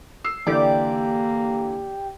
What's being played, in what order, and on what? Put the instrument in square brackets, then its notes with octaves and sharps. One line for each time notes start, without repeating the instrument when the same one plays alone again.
[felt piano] E6 C7
[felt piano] D3 E3 [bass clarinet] A#3 [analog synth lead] G4 [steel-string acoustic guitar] D5